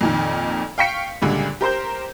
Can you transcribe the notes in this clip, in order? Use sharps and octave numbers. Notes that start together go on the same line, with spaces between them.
F2 A#2 D#3
F5 G5 C#6 B6 C#7
C#2 A#2 D3 G3
G4 A#4 C5 G6